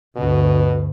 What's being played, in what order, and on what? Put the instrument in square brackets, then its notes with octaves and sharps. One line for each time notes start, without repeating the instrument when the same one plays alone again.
[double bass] D2 G2 [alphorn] B2